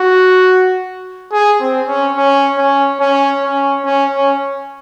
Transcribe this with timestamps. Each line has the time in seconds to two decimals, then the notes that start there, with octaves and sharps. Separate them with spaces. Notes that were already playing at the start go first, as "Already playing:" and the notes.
Already playing: F#4
1.32 G#4
1.60 C4
1.88 C#4
2.17 C#4
2.58 C#4
3.00 C#4
3.44 C#4
3.85 C#4
4.14 C#4